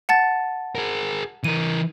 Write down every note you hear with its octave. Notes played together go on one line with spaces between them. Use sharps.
F#5 A5 A6
G#4 A#4
E3 A#4 D#7